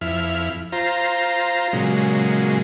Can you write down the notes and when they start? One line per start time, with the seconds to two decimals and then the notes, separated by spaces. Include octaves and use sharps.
0.01 F2 E4 F6
0.72 F4 C5 A#5
1.73 A#2 C#3 F#3 G#3